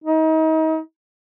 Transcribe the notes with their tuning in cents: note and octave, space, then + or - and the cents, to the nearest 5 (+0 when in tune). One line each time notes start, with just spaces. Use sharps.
D#4 +35